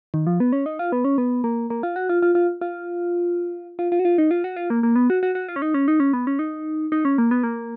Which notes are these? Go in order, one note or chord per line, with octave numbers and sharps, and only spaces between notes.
D#3
F3
B3
C#4
D#4
F4
B3
C#4
B3
A#3
A#3
F4
F#4
F4
F4
F4
F4
F4
F4
F#4
F4
D#4
F4
F#4
F4
A#3
A#3
B3
F#4
F#4
F#4
F4
C#4
D#4
C#4
D#4
C#4
B3
C#4
D#4
D#4
C#4
A#3
B3
A#3